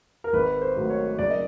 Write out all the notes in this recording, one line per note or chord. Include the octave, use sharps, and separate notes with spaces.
A#4
G#1 B4
C5
G#2 D#3 F#3 A3
C#5
F#1 D5
D#5